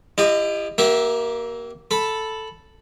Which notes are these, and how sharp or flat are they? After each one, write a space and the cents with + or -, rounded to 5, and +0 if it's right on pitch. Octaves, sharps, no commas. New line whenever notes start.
E4 +35 G4 +25 D#5 -15
A#3 +15 G4 -35 E5 -10
A4 +0 B5 +0